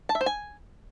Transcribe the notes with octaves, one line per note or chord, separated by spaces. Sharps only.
A5
E5
C5
G#5